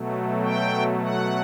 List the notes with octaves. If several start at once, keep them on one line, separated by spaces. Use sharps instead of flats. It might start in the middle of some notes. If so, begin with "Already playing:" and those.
Already playing: B2 F#3 A3
G5
F#5